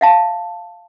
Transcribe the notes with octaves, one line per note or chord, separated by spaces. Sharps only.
E5 F5 A5